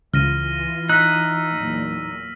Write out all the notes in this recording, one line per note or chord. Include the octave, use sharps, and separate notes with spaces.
C#2 E3 F4 F6 A#6 D#7
D#4 E6 F#6 B6
E2 A#2 F#3